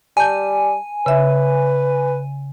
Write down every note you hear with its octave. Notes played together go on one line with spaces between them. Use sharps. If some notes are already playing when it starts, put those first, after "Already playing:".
G3 G#5 A5 G6
C#3 B4 E5